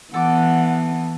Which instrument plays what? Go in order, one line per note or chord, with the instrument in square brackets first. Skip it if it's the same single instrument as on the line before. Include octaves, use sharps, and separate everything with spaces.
[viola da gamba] E3 B3 [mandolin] A4 D6 [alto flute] F#5